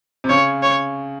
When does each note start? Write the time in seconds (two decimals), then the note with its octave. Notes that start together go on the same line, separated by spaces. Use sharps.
0.24 C3
0.29 C#3 C#5
0.63 C#5